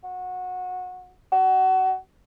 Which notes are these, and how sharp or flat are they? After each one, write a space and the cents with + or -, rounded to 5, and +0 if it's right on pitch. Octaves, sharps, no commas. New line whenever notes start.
F#4 -20
F#4 +25